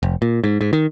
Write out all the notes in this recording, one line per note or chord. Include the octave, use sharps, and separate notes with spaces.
F1
A#2
G#2
G#2
D#3